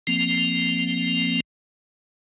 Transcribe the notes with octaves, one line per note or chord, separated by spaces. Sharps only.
F3 A#3 C4